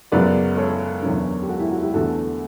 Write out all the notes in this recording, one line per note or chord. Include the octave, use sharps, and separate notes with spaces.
F#2 C#3 F#3 B3 B4 D5
A4 C#5
E2 D3 F#3 C#4
G4
F#4 A4
E4 G4
F#4
E4 G4
E2 D3 A3 F#4 A4